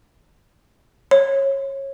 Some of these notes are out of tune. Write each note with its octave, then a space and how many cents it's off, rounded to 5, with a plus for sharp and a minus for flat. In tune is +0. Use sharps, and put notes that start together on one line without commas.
C#5 -25